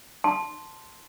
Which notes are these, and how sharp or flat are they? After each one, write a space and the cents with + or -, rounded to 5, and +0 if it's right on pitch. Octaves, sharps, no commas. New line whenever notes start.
A5 +0 C6 +0